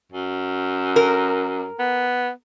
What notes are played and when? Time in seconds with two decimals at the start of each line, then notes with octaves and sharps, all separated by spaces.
0.12 F#2
0.96 A#4
1.79 B3